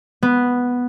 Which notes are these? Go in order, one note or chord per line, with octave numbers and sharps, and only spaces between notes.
B3